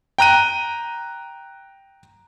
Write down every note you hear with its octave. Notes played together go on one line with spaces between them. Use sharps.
G5 A#5 F#6 D#7